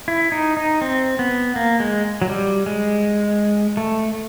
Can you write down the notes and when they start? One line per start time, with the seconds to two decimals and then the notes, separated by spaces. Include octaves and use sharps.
0.08 E4
0.32 D#4
0.57 D#4
0.81 C4
1.19 B3
1.56 A#3
1.80 G#3
2.22 F#3
2.29 G3
2.66 G#3
3.77 A3